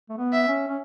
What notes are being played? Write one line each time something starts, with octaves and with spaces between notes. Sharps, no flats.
A3
B3
E5
C#4
C#4